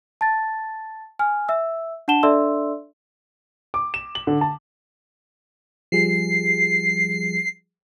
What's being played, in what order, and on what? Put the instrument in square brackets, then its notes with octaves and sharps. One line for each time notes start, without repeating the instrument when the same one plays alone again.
[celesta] A5 A6
G#5 F6
E5 E6
D4 F#5 A5 E7 G7
D4 A4 D5 E5 C6 E6
[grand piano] D6
E7
F#7
D3
A5
[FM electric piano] F3 G3 G#4 [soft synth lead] C7